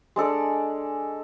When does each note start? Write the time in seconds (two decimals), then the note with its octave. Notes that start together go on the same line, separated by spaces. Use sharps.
0.16 G#3 D4 A4 D5